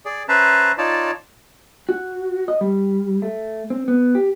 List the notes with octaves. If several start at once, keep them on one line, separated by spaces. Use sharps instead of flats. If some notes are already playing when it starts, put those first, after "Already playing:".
G#4 D5
C#4 B4 C5 E5 A5 A#5
D#4 F4 C#5 D5 A5
F#4
D#5
G3
A3
C4
B3
G4